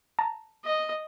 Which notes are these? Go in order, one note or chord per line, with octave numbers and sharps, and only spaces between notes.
A5 A#5
D#5